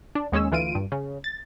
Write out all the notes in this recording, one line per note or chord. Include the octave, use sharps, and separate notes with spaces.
D4
D#2 G#3 C#4 G#4 E6
D2 E3 F4 D7 D#7
G2
C#3
A6